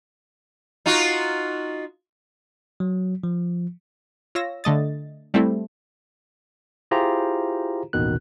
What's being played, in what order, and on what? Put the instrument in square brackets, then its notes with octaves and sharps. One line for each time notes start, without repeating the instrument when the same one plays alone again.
[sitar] D#4 F4 F#4
[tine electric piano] F#3
F3
[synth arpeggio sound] F4 C#5 E6 A#6
D3 A3 D#5 A6
G3 A3 C4 E4 A4
[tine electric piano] E4 F4 G4 G#4 C5 A#5
A1 D#2 B2 D#3 F#6